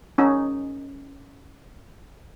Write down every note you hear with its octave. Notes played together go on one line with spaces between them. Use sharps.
C#4 D#4